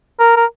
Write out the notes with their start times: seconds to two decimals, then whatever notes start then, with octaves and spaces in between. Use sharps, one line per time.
0.20 A#4
0.37 A#4